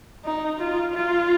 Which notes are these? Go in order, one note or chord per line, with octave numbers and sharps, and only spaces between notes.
D#4
F4
F4